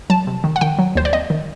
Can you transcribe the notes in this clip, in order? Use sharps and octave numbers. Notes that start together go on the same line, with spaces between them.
F#3 A5
C3
D#3
F#5
D#3 G5
F#3
D#2 C5
D5
C4 D#5
D#3